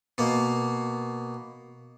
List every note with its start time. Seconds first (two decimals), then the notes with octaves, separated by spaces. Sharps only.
0.18 B2 A#3